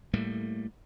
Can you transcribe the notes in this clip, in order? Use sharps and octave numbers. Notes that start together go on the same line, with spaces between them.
A2 G3 A3 A#3